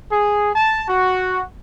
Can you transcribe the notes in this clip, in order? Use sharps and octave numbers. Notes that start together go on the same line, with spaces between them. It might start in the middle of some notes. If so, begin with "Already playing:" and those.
G#4
A5
F#4